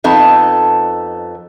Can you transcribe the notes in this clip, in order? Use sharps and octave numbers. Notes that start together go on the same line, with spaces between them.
F2 B3 D#4 A4